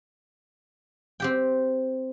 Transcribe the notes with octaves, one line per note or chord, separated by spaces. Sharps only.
C4 G4 G5